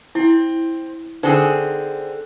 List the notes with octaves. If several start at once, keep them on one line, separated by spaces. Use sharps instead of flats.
C4 E4
D3 C4 D#4 G#4 C5